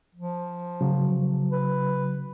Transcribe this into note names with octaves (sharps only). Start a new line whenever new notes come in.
F3
C#3 F#3
B4